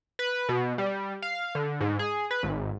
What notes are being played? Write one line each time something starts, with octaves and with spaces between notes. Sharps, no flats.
B4
B2
G3
F5
D3
G#2
G#4
B4
G#1